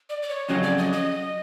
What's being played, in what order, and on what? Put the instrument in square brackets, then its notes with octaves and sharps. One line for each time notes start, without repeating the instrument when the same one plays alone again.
[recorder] D5
D5
C#5
[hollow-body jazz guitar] F2 C#3 F#3 [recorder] D#5
[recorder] D5
D#5
D#5